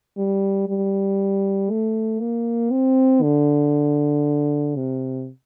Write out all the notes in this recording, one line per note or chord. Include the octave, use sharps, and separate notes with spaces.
G3
G3
A3
A#3
C4
D3
C3